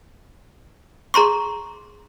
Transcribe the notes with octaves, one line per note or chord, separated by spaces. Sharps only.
G#4 A#5 C6 C#6